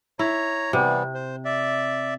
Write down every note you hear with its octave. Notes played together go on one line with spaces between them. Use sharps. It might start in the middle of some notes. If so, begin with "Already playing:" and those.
E4 C#5 A#5
C3 E3 G3 B3
C5
D5 E5